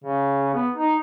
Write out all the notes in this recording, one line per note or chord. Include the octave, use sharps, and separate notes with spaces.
C#3
B3
D#4